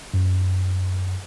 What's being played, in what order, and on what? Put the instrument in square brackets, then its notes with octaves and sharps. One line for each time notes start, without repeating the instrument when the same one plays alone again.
[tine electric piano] F#2